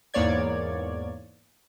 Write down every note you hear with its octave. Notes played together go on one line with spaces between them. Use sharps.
E2 G#2 A#3 C#5 D5 G#6